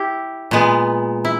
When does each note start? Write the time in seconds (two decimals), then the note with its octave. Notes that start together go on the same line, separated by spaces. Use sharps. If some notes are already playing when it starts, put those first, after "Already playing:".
Already playing: E4 G4
0.51 A#2 G#3 B3
1.25 E4